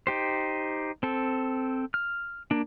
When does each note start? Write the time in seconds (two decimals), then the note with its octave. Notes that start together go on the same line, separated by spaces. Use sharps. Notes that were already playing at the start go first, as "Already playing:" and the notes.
0.07 D#4 G4 C5
1.03 C4 A4
1.94 F6
2.51 A#3 D4